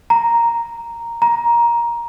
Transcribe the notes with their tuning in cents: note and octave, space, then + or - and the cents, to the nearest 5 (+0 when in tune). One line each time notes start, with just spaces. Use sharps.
A#5 +0
A#5 +15